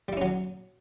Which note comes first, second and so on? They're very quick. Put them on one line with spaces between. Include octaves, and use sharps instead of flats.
G3 E4 C#4 F#3